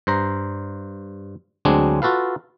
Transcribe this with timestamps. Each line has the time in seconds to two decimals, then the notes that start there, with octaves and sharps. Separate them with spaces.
0.07 G2 C5 A#5
1.65 D2 F#3 G#3 C4 D4 G#4
2.02 F4 F#4 A4 B4 F5